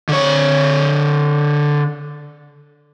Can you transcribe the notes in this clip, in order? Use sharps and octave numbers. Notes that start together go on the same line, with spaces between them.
D3 C#5